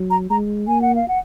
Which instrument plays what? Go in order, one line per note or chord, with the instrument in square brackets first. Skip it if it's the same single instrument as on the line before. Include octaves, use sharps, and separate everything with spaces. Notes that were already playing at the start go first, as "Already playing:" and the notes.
Already playing: [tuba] F#3
[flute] A#5
[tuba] G#3 [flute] A#5
[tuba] A#3 [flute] G#5
[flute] F#5
F5
F#5